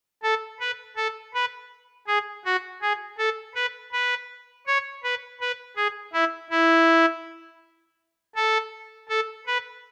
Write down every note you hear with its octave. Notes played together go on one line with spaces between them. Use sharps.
A4
B4
A4
B4
G#4
F#4
G#4
A4
B4
B4
C#5
B4
B4
G#4
E4
E4
A4
A4
B4